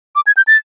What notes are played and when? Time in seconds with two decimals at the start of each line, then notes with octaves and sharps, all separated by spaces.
0.16 D6
0.27 G#6
0.37 G6
0.47 A6